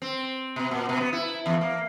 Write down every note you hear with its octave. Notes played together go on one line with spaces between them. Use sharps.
C4
B2
A#2
B2
B3
E4
E2
A#3